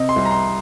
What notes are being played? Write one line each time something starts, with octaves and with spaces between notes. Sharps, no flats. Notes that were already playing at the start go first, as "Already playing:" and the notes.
Already playing: C3 D#5
C6
C2
A#5
C6